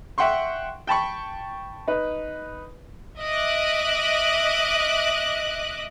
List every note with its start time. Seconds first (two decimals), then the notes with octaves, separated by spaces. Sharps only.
0.18 E5 F#5 G5 C6 C#6
0.87 G5 A5 B5 C#6
1.87 D#4 B4
3.19 D#5 E5 D6 F#6